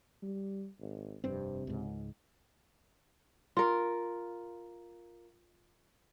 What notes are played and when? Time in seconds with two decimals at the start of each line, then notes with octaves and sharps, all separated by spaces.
0.22 G3
0.80 G#1
1.24 F1 G2 C3 C4
1.67 C#2 G#2
3.57 F4 A#4